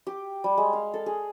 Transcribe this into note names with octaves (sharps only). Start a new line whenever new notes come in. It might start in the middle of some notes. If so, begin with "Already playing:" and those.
G4
G3
G#3
F5
A4
G#4